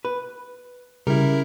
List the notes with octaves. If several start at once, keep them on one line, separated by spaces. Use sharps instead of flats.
B4
C#3 G3 E4 A#4